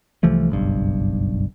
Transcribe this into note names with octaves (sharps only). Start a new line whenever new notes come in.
C2 E3 F3 A3
F#1 B1 G2